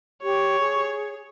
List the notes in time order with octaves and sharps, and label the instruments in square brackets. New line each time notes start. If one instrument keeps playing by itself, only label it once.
[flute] G4 [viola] C#5
[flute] G#4